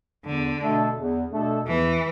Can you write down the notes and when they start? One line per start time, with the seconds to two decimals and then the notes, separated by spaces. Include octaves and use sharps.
0.24 E2 D3
0.59 B2 A3 D4 A4
0.95 E2
1.31 B2 A3 D4 A4
1.65 E2 E3